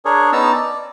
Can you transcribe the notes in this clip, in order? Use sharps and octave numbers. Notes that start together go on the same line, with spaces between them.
D4 G#4 A#4 C#5
B3 C#4 D#4 A5 A#5 E6
D5